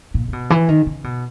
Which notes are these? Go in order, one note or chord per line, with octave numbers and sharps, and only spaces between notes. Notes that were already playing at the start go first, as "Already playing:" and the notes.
A#2
C#3
B2
E3
D#3
C#3
B2